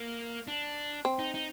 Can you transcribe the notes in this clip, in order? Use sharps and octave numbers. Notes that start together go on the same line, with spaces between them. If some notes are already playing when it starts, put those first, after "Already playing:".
Already playing: A#3
D4
C4
D#4
D#4